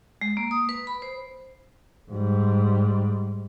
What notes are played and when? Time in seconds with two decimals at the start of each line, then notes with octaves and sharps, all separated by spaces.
0.21 G#3
0.37 A#3
0.51 D#6
0.69 B4
0.87 B5
1.02 C5
2.11 G#2 G3